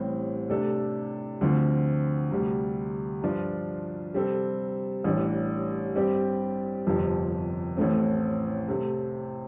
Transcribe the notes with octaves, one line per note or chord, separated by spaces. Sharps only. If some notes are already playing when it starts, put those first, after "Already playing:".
Already playing: A1 A2 G3 C4
C3 A3 D4 A4
D2 D3 F3 C4 F4
D2 C3 G3
G2 F3 D4 F4
C3 G3 C4 A4
A1 A2 G3 D4
G2 G3 C4 G4 D5
G1 F2 C3 F3
A1 A2 A3 C4
C3 A3 C4